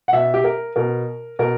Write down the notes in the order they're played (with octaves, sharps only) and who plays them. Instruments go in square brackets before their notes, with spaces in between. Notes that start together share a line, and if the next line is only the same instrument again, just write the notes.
[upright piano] F#5
B2 E5
G4
A#4
B2 A#4
B2 A#4